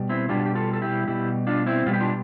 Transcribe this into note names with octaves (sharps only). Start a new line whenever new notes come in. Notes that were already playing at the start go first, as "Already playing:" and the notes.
Already playing: B2 G3
C4 E4
B2 G3 D4 F4
G4
F4 A4
A4
E4 G4
B2 G3 E4 G4
D4 F4
C4 E4
B2 G3 F4
G4
D4 F4